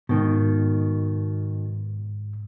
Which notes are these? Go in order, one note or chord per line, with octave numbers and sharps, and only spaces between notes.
G#2 B2 D#3